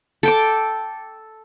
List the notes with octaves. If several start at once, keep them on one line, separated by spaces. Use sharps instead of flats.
A4 G5 D6